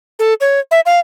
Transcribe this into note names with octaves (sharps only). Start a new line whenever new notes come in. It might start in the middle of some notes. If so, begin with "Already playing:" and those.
A4
C#5
E5
F5